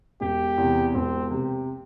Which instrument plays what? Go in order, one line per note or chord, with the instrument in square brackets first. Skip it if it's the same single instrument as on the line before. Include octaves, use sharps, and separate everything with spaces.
[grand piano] E1 [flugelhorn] G4
[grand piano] E2 C3
[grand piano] E1 [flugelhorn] C4
[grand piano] C3